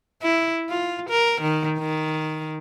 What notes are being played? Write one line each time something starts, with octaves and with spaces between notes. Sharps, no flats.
E4
F4
A#4
D#3
D#3